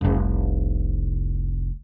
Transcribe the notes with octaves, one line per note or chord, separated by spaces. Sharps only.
F1 C2